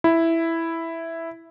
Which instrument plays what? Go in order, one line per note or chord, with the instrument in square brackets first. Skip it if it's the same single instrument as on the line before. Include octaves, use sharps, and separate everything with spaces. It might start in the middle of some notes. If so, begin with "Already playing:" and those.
[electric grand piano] E4